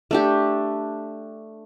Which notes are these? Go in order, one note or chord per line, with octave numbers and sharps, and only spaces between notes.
A3 D4 G4